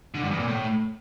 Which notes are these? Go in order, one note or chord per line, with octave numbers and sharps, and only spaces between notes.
D3
G2
E2
A#2
A2